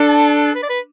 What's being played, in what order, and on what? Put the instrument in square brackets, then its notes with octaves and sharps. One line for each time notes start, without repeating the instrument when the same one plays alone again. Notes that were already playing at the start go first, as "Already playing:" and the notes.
Already playing: [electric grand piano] D4 [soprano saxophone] A4
[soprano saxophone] B4
D5
B4